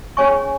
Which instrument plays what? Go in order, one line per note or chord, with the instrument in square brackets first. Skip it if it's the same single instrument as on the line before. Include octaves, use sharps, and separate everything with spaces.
[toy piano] C#4 G#4 C#5 G#5 C#6